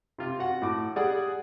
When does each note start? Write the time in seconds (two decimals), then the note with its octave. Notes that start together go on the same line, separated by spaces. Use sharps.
0.18 C3 F4
0.39 F#4 F#5
0.62 A2 D6
0.96 G3 G#4 D5 F#5